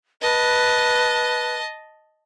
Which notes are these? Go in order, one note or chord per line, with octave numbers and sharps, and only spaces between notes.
B4 D#5 A5